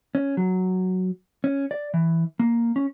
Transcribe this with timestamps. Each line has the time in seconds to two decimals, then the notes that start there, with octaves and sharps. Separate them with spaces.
0.15 C#4
0.37 F#3
1.44 C#4
1.71 D5
1.94 E3
2.40 A#3
2.76 C#4